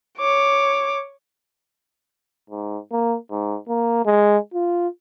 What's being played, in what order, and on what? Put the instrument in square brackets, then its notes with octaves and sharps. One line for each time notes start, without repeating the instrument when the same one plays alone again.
[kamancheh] C#5 D6
[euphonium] G#2
A#3
G#2
A#3
G#3
F4